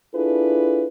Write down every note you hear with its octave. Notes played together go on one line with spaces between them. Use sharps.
D4 E4 F4 G#4 A4 B4